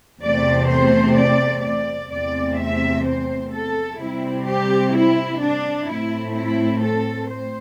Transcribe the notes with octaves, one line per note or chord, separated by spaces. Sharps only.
E2 C3 A3 C4 D5
C5
D5
D5
E2 C3 A3 C4 D5
E5
C5
A4
C3 G3 C4 E4
G4
E4
D4
A2 A3 C4 E4
E4
A4
C5